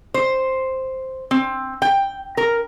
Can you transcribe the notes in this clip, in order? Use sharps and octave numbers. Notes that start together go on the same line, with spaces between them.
C5
C4
G5
A#4